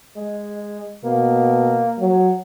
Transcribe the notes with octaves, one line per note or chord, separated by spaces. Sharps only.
G#3
B2 A#3
F#3